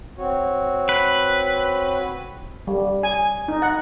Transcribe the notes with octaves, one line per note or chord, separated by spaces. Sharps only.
C4 F#4 C#5
B4
G3
G#5
D#4
F#5